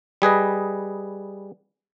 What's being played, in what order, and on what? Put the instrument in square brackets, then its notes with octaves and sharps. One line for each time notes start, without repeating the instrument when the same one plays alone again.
[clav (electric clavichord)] G3 G#4 B4 D#5